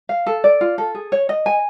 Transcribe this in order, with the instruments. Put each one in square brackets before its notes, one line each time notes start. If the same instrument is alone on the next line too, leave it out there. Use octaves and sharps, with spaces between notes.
[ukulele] F5
A4
D5
F4
A4
G#4
C#5
D#5
G#5